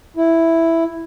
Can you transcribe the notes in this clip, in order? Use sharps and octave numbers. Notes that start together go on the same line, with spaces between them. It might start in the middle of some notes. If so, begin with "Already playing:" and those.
E4